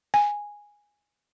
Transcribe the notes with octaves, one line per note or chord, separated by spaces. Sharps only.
G#5